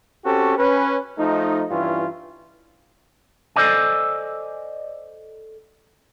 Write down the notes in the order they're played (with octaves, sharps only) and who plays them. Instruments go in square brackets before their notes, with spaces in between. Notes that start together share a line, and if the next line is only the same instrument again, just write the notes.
[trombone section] C4 C#4 F#4 G4 A4
C#4 B4
F3 A3 D#4
G2 E3 C#4 E4 F4
[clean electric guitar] A4 A#4 C5 D5 D#5 G#5